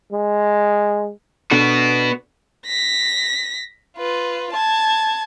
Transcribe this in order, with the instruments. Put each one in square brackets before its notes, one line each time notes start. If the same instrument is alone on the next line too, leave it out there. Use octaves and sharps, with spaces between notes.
[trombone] G#3
[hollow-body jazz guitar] B2 D4 A4 [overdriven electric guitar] B3 F#4
[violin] A#6 B6
F4 B4
A5 G#6